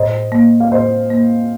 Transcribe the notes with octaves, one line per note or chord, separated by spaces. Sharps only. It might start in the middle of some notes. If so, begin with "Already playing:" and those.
Already playing: A2 C5 D#5
A#3
F5
A2 C5 D#5
A#3